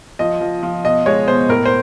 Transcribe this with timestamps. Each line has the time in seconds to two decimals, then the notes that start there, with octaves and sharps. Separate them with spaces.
0.19 F3 D#5
0.41 F3
0.63 F3
0.84 B2 D#5
1.06 G#3 C#5
1.28 B2 C5
1.49 A2 A#4
1.66 C5